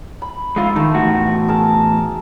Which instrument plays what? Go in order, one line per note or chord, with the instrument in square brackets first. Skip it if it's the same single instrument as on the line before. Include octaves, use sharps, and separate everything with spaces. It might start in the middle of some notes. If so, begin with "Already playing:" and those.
[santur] B5
[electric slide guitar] G#3 F4 [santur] D#4 E5 C6
[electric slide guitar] D#3 [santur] G3 A3
[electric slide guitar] E2 A2 F#4
[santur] G#4 A#4 A5